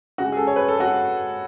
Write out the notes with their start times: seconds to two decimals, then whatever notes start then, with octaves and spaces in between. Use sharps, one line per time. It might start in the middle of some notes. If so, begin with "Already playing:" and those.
0.18 C#3 G#3 F#4
0.32 G#4
0.37 A4
0.47 C#5
0.56 B4
0.68 A4
0.80 F#4